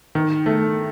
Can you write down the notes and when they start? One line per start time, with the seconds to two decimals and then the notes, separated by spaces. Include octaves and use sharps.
0.15 D#3
0.46 A3